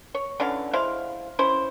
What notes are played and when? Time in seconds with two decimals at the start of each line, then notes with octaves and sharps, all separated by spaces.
0.14 C#5
0.40 D3 E3 C#4 F5
0.73 G#3 E4 C5 F5
1.39 C#4 E4 C5